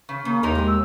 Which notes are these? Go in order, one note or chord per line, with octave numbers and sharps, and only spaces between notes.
C#3
C#3 A#3
D#2 C3 D#4 A#4
G#3 A#3
E6